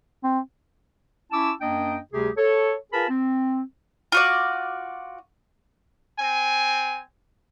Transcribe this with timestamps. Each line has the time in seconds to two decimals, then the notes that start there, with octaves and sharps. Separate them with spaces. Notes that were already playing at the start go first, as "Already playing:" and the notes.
0.24 C4
1.32 C#4 E4 A5 D6 E6
1.61 F#2 A#3 D4 D#5 G5
2.13 D2 C3 G3 G4 G#4
2.37 A4 C#5
2.93 F4 G#4 A#4 B4 A5 B5
3.09 C4
4.12 F4 F#4 D5
6.20 C4 G#5